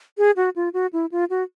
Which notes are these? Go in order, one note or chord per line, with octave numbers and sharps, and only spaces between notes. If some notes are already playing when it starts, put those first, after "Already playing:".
G#4
F#4
F4
F#4
E4
F4
F#4